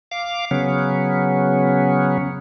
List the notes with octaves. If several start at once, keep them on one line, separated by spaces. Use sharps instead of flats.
F5 D6
C#3 F#3 B3 C#4